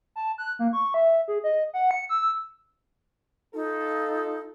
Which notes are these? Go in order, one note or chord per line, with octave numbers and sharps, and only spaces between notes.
A5
F#6
A#3
C#6
E5
G#4
D#5
F#5
C#7
E6
D#4 F4 A4